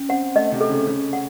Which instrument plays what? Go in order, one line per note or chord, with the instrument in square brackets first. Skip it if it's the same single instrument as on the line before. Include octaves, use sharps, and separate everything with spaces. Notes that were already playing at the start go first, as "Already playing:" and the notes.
Already playing: [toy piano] C#4
[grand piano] C4 [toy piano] F#5
[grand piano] A3 [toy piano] D#5
[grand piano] C3
[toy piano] A4
[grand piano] C#3
[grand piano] C#3 [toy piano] C#4
[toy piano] F#5